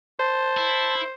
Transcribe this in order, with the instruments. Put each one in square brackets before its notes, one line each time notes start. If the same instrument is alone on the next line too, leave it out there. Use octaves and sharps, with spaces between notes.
[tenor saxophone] C5 [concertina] A5 C6
[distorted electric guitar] E4